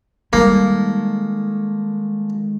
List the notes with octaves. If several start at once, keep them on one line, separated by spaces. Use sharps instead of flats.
D#3 G3 G#3 A#3 A4